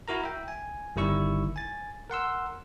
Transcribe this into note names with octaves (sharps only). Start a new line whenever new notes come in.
E4 F#4 A#4 A#5
E5 G5
G#5
G1 D#3 G3 E4 C#6 E6
G#5 A6
A#4 F#5 C6 E6